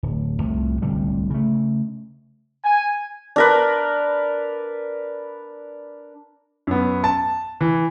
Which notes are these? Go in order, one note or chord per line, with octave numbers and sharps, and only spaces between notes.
D1
C2 F2 A2 A3
D1 C2 D3 G3
C#3 A3
G#5
D4 A#4 B4
F#2 B3
A5
E3